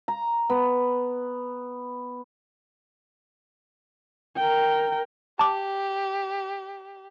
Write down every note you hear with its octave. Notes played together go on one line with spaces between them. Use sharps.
A#5
B3
A#4 G5
G4 A5 D6